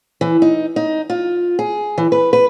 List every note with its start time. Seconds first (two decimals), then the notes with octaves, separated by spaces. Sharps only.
0.21 E3
0.42 D#4
0.76 D#4
1.10 F4
1.59 G#4
1.98 E3
2.12 B4
2.33 B4